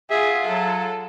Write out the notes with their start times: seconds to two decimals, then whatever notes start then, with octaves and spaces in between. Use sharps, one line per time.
0.10 F4 G#4 E5 F#5
0.46 F#3 A4